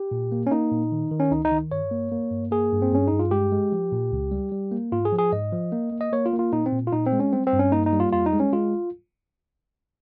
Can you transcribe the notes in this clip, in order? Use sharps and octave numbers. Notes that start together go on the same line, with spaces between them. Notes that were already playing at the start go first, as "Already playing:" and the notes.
Already playing: G4
A#2
A#3
C#4
A#3 D#4
A#2
D#3
D#3
C#4
C#2 D#4
D#4
D#3
G2 C#5
A#3
A#3
G2
A#3 G#4
G2
C4
G2 C#4
G2 D#4
F4
G#3 G4
G#3
F3
A#2
C#2
G3
G3
A#3
G#2 F4
G#4
F3
G#4
G#2 D#5
F3
A#3
A#3
D#5
A#3 C#5
F4
A#3
F4
A#2 D#4
C4
A#2
F4
A#2 D#4
C4
G#3
C#4
G3 C4
C4
G2
C#4
A#3 D#4
D#4
G3
F4
F2 F4
D#4
G#3
C#4
G#3 F4